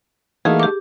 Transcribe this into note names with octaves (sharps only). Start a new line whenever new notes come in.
E3 A3 A#3 D#4 F#4 G#4 F5
G4 D6